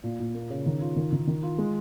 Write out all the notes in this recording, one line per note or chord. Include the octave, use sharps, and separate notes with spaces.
A#2
A#2
A#3
C#3
D#3
F4
D#3
D#3
D#3
F4
G#3